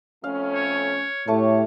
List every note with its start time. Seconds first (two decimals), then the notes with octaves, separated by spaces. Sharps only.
0.24 F2 A3 C#4 F5
0.54 C#5
1.28 A2 A3 G4 C#5 A5 C#6